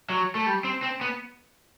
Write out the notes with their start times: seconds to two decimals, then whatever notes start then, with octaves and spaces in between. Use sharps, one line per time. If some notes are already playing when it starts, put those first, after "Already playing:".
0.09 F#3
0.35 A3
0.46 G3
0.64 C4
0.83 C4
1.01 B3